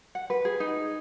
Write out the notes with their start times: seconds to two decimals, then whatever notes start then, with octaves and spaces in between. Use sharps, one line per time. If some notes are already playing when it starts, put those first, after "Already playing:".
0.15 F#5
0.30 B4
0.45 G#4
0.60 D#4